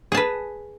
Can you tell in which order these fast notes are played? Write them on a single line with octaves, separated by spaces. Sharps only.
G#4 A5 B4